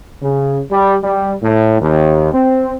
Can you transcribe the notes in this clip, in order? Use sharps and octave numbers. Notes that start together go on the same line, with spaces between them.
C#3
G3
G3
A2
D#2
C4